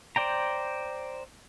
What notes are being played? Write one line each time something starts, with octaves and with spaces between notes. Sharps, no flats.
C5 D5 G5 A#5